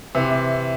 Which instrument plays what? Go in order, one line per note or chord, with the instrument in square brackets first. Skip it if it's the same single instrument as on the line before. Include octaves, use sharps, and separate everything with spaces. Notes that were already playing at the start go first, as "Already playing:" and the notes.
[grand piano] C3 E3